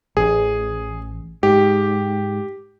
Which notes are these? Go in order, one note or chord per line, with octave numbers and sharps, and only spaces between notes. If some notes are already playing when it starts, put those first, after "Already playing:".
A1 G#4
G#2 G4